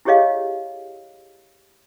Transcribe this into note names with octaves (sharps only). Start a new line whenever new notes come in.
E4 G4 G#4 C#5 D#5 F5